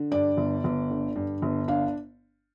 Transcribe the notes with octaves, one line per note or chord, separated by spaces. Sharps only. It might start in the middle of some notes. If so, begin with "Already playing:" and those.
Already playing: D3
G2 D5
G1
G1
D3
G2
G1
D4 F5